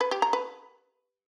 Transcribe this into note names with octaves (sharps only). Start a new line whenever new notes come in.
B4
G4
A#5
B4